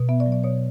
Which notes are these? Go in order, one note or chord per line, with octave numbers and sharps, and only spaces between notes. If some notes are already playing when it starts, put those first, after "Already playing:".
Already playing: B2
B3 E5
D5
F#3
D5
B2 C#5